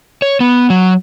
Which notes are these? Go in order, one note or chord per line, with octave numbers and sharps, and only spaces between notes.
C#5
B3
F#3